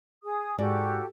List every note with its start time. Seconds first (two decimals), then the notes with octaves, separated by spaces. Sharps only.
0.23 G#4 D#6
0.58 G#2 F#4 G4 A4 D5